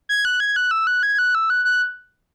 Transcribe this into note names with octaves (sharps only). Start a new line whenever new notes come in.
G#6
F#6
G#6
F#6
E6
F#6
G#6
F#6
E6
F#6
F#6